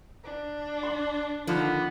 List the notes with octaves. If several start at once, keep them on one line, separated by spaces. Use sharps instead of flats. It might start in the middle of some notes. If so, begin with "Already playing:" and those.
D4
C6
D3 D#3 F3 A#3 B3